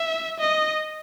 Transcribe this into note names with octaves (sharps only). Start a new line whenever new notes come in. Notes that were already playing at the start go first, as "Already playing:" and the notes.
Already playing: E5
D#5